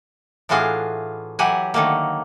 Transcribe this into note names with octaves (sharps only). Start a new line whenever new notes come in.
A2 E3 D4 F4 F#4 G#4
E3 F#3 G4 F#5 G#5
D3 D#3 A3 A#3